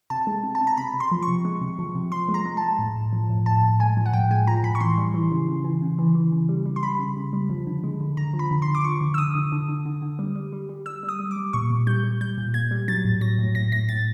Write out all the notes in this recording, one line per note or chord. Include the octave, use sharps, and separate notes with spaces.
C3 A5
G#3
C3
A5
C3
A#5
C3 B5
C3
C6
F3
C#6
C3
G#3
C3
F3
C3
F3 C6
G#3
A#5
G#3
G#3 A5
A2
A2
F3
A2
A2 A5
A2
G#3 G#5
F3
F#5
A2 G5
G#3 G#5
F3 A#5
A2 B5
C#6
E3 C6
G3
E3
C#3
C#3
E3
C#3
E3
E3
C#3
G3
G3
C6
G3 B5
C#3
C#3
G3
F3
D3
G#3
D3
D3 A#5
F3
B5
D3
C6
D3
D6
F3 C#6
D3
E6
D3 D#6
D3
D3
D3
D3
D3
G3
G3
G3
G3
G3 E6
G3
D#6
G3
D6
G3
A#2 C#6
A#2
G3 G6
G3
G3 G6
A#2
A#2 G#6
G3
F#3 A6
A2
F#3 A#6
A2
A2 A#6
A2 A#6
A2 A6